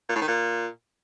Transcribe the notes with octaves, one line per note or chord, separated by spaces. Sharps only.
A#2
A2
D#3
A#2